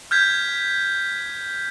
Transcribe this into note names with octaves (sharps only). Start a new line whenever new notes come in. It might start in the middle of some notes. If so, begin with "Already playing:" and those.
F6 G6 G#6 B6